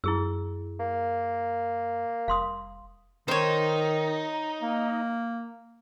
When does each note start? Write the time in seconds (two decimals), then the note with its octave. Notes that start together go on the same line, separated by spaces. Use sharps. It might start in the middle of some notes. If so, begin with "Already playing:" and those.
0.04 F#2 E4 G#4 E6
0.80 A#3
2.28 F1 F5 C6 D#6
3.28 D#3 D#4 C5 C#5
4.62 A#3